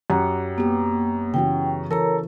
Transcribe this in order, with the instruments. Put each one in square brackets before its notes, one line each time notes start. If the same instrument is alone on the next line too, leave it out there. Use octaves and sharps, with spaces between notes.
[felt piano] F#2 [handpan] G4 F#5
[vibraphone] A#3 [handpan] B3 G4
[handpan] C#3 E3 F#4 [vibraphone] G5
[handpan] E3 [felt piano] A4 [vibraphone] A#4 C#5 A#5